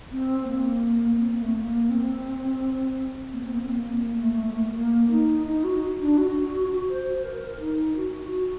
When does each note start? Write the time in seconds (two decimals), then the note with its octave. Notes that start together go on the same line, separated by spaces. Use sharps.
0.12 C4
0.47 A#3
1.19 C4
1.30 A#3
1.42 A3
1.54 A#3
1.90 C4
3.32 A#3
3.43 C4
3.54 A#3
3.64 C4
3.75 A#3
4.04 A#3
4.22 A3
4.40 A3
4.57 A#3
4.75 A#3
5.11 D#4
5.46 D#4
5.64 F#4
6.00 D4
6.18 F#4
6.89 C5
7.24 A#4
7.60 D#4
7.96 F#4
8.31 F#4